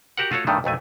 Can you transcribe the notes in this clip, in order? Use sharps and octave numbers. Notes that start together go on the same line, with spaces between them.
F#4 G4 A#4 F#5
A3 F4 F#4 A4 C#5
E2 G2 D#3 E3 A3
B1 F2 A3 G#5